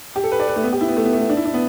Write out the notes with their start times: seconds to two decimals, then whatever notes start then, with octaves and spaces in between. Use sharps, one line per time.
0.16 G4
0.24 A4
0.32 B4
0.40 D5
0.48 B4
0.56 A3
0.64 B3
0.73 G4
0.81 E4
0.88 B3
0.97 A3
1.05 B3
1.13 A3
1.21 B3
1.29 D4
1.37 E4
1.45 D4
1.54 B3